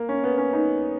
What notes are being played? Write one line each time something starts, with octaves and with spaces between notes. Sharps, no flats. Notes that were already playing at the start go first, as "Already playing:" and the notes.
Already playing: A#3
C#4
B3
C#4
D#4